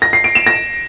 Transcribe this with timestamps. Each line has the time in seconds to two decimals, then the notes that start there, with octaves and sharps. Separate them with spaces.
0.02 A#6
0.13 C7
0.24 D7
0.35 E7
0.47 A#6